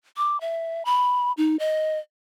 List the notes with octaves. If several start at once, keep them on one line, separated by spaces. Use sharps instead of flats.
D6
E5
B5
D#4
D#5